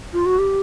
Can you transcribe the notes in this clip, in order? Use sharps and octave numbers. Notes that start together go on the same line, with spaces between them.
F4
F#4
G4